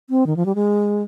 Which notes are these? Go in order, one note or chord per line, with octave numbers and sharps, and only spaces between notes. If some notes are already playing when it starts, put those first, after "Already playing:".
C4
D#3
F3
G3
G#3